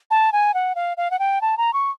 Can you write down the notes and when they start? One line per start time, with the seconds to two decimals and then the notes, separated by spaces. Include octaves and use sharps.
0.11 A5
0.32 G#5
0.54 F#5
0.75 F5
0.97 F5
1.11 F#5
1.19 G5
1.41 A5
1.58 A#5
1.73 C#6